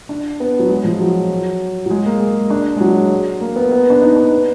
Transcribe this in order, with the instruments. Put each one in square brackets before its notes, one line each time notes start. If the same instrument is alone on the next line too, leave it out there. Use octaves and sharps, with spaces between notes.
[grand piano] D4
B3
F#3
G#3
F3
F#3
F#3
G#3
A#3
G#3
D4
G#3
F#3
A#3
B3
B3
D4
D#4
D4
B3